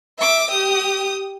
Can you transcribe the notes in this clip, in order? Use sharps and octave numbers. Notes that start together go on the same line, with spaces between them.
E5 D6
G4 D#6